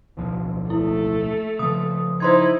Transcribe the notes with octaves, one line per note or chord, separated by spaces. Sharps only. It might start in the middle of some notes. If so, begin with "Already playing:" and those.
D1 B1 F3
A3 E4
C#3 F3 D#6
D#4 E4 C5 C6 G#6